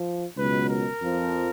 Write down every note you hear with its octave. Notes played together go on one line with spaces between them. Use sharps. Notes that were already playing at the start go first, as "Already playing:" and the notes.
Already playing: F3
C#2 B2 F#3 B4
A#4
F2 F3